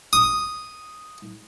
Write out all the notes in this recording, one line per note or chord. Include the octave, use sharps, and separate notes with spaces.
D#6